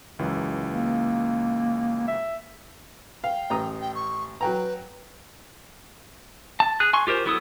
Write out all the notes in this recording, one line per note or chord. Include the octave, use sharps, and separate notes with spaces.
C#2 F#2 E3
A#3
E5
F5 G5
A1 A#5 D#6
G5
C#6
F#3 B4 G5 A#5
A5
G#4 F#6
G#5 C6 C#6
F4 G4 A#4 C5
F#3 B3 E4 A4 D#6